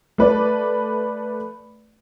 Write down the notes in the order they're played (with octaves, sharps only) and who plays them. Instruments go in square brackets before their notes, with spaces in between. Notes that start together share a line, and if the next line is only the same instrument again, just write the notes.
[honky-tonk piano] A3 B4 D5